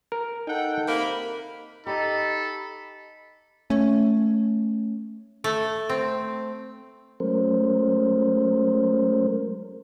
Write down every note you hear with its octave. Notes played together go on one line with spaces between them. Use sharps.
A#4
D#4 A4 F#5 G5
C3 A#3 A#4 B5
D#4 G4 A4 D#5 B5
A3 C#4
A3
C4
F#3 G#3 A3 C#4 A#4 C5